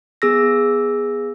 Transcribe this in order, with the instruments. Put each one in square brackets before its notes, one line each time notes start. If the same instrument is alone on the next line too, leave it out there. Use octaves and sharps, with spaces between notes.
[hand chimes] B3 G#4 E6 A#6